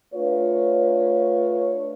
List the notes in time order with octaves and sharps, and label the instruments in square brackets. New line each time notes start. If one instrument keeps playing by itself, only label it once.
[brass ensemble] A3 D4 F4 B4 C#5